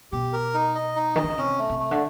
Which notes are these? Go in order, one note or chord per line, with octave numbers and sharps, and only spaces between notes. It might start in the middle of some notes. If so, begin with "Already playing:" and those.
B2 G4
A#4
D#4
D#5
D#4
D#3 D#5
D3
C#3
C3 C#4
A3
C3
A3
D3